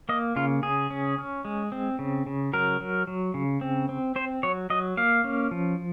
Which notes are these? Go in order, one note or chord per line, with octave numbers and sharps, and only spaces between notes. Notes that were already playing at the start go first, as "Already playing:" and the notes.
A#3 D#5
C#3 F4
C#3 G#4
C#4
C#4
G#3
C4
C#3
C#3
F#3 A#4
F#3
F#3
C#3
C4
C4
C4 C5
F#3 C#5
F#3 D#5
A#3 F5
C#4
F3